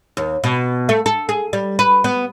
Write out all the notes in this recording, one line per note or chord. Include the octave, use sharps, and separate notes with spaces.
D#2
B2
A3
A4
G#4
G3
B4
B3